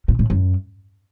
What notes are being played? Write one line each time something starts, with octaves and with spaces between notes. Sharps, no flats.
A#2
A2
F#2